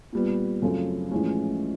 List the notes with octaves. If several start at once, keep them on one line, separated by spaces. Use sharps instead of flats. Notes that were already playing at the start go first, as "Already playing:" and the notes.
A#2 G3 B3
F#2 C#3 F3 A3 C4
A#1 A2 E3 G#3 C#4